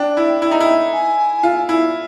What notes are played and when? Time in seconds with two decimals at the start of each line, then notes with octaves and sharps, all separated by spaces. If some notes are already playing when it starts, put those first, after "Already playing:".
Already playing: D4 G5
0.17 E4
0.42 E4
0.51 D#4
0.60 E4
0.93 G#5
1.43 F4
1.69 E4